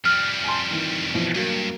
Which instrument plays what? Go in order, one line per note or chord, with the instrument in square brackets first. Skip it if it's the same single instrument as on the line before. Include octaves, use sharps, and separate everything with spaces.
[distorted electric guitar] F2 G3 [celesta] F6
[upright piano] G#5 A5 C6
D#3 E3
B2 E3 F3
[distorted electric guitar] G2 [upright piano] F#3 A#3 D7